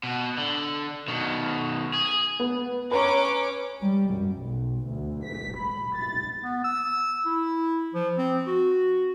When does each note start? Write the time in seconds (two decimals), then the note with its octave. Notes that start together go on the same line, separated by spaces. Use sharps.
0.03 B2
0.38 D3
1.08 B2 D#3
1.94 G#4
2.40 B3
2.91 C#4 B4 A#5 D6
3.82 G3
4.13 F#2
4.42 B1
4.88 D2
5.25 B6
5.59 B5
5.97 A6
6.44 B3
6.64 E6
7.26 E4
7.94 F3
8.18 C4
8.47 F#4